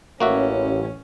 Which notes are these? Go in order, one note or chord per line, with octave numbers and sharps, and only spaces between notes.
A1 A#3 C#4 F#4 E5